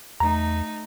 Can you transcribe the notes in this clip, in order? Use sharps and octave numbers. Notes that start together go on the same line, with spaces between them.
E2 A3 D#4 A#5